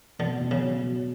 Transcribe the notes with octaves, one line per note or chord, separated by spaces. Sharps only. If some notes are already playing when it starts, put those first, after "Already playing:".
B2 D3
B2
C#3
F#3
B2